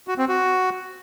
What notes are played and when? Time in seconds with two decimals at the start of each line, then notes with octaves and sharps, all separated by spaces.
0.08 F#4
0.18 C4
0.29 F#4